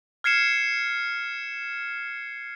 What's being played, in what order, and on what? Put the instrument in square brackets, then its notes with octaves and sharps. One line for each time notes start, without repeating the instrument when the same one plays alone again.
[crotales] F6 G#6 C7 C#7 E7